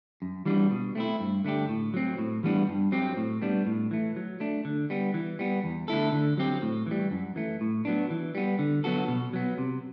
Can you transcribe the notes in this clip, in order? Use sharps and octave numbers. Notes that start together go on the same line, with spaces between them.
F#2
E3 G3 B3 D4
B2
A3 C4 E4
G2
D3 A3 D4 G4
A2
F#3 C4
A2
E3 G3 B3 D4
G2
F#3 C4 G4
A2
G3 B3 D4
A2
E3 A3
F#3
A3 D4
D3
G3 B3
E3
G3 B3
E2
D3 A3 E4 A4
D3
F#3 C4 G4
A2
E3 G3
F#2
E3 A3
A2
F#3 B3 D4
E3
G3 B3
D3
F#3 B3 F#4 A4
B2
F#3 B3
C3